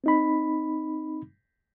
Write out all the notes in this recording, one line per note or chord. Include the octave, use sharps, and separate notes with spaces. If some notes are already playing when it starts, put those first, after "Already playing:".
C4 D#4 B5